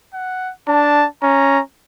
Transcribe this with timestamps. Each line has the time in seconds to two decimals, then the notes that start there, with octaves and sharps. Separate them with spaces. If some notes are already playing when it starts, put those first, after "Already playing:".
0.14 F#5
0.68 D4 A5
1.22 C#4 A#5